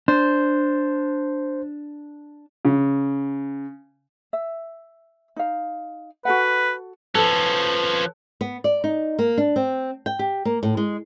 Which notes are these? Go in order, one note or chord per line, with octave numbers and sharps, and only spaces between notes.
D4 C5
C#3
E5
D#4 F5
F#4 A4 B4 F#5
F3 C#4 A4 B4
B3
D5
D#4
A#3
D4
C4
G5
G4
A#3
A2
G#3